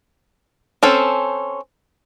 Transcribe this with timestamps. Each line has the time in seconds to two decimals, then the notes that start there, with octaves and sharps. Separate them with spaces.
0.83 C4 C#4 A4 C5